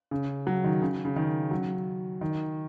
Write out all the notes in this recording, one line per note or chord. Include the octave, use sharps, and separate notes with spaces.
C#3
F#3
D#3
C#3
C#3
D#3
F#3
D#3